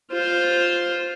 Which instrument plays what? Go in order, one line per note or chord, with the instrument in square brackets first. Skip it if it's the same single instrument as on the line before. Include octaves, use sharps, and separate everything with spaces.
[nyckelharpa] F4 C5